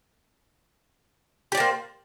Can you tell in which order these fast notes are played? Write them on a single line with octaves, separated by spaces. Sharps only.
G4 D5 C5 A#3